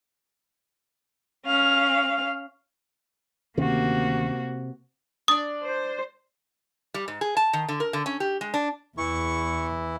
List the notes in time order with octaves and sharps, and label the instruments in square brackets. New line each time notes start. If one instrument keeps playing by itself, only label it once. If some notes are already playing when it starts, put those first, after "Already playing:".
[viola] C#4 F5
[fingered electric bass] D2 D#3 C#4 [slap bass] C3 [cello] A#3 F#4
[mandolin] D4 D5 [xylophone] D#6
[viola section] C5
[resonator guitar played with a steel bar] G3
G#2
G#4
A5
D#3
D3
A#4
D3
C#4
G4
G#3
D4
[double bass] E2 [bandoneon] E3 E4 [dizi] C#6